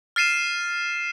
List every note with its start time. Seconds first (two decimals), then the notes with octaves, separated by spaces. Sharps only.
0.16 F6 A6 C7 D#7 E7